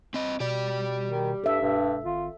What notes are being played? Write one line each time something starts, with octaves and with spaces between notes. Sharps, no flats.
C4 D#5
B2 G4 D5
D#3
G2 A4 E5
E1 G2
G#1 F4